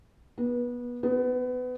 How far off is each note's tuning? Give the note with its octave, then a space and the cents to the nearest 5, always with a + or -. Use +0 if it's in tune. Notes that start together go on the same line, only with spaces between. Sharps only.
B3 -25
B3 +25